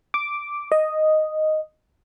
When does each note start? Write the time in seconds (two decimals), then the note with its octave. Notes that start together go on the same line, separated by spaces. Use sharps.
0.14 D6
0.72 D#5